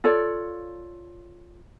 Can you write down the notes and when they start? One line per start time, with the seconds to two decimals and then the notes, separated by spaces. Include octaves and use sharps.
0.04 F4 A4 C#5 D5